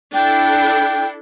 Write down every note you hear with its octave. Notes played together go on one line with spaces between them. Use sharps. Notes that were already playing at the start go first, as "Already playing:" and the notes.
D4 E4 A4 G5